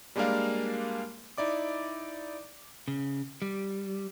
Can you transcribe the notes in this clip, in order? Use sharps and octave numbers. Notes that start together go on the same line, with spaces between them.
G3 G#3 A#3 D4 A#4 F5
D#4 E4 D5 D6
C#3
G3